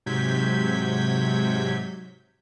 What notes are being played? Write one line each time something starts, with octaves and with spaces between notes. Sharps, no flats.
G#2 C3 F#3 G6 G#6 B6